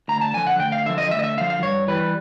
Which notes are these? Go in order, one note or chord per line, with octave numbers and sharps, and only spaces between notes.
D2 A#5
A5
D3 F3 G#5
F#5
D2 G5
F5
D3 F3 E5
D#5
D2 E5
D#5
E5
D3 F3 F5
F5
G2 C#5
E3 G3 B4